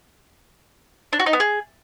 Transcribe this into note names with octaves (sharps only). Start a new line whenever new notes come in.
D4
F#4
D#4
B3
G#4